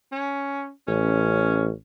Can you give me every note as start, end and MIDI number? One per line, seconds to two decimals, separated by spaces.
0.12 0.70 61
0.87 1.70 33
0.87 1.76 61